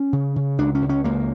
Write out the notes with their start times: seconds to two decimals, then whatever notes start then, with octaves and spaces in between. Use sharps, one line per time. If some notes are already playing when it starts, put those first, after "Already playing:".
Already playing: C#4
0.13 C#3
0.36 C#3
0.59 C#2 D4
0.75 C#4
0.82 C#2
0.89 C#4
1.04 C#2 A#3